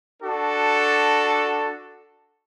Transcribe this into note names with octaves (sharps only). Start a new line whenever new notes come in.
D4 F#4 A4